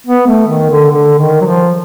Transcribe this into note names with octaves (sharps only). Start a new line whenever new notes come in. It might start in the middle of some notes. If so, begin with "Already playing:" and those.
B3
A3
D#3
D3
D3
D#3
F#3
F3